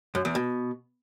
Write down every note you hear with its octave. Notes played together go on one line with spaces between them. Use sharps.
F#2
E2
B2